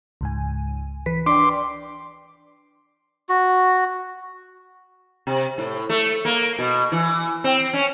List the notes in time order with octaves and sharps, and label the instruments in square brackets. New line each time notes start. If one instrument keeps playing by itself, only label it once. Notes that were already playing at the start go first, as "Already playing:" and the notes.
[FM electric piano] C#2 G#2 G#5
E3 B4 B6
[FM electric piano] D4 D5 G5 [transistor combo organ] C6 D6
[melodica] F#4
[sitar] C3
A2
A3
A#3
B2
E3
C4
C#4